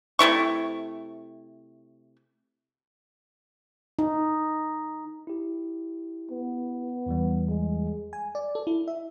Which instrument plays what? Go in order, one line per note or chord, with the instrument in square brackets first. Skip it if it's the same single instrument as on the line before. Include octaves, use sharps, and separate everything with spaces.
[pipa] C3 A3 E4 C#6
[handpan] D#4
[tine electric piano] E4 G4
[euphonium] B3
[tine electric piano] E2 E3 G3
[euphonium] G#3
[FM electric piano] G#5
D5
A4
E4
E5